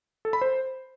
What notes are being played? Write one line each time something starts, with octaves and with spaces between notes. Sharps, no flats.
A4
B5
C5